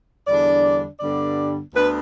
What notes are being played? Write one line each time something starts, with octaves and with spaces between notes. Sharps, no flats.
E2 D3 G3 D4 D5
G2 D3 G3 B3 D4 D5
D2 D3 B3 D4 B4